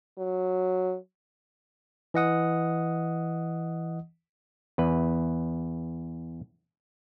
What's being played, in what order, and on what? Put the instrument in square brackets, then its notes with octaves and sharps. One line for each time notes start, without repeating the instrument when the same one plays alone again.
[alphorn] F#3
[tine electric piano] E3 D#5 F#5 D#6
[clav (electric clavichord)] E2 B4